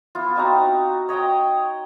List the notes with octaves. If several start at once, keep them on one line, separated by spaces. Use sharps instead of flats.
B3 E4 F4
C4 D#4 F#4 A#5
C#5 D#5 G5 A#5